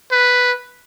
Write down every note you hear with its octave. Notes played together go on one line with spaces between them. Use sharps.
B4